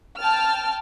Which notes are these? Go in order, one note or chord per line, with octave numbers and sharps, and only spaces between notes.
G5 A5 F6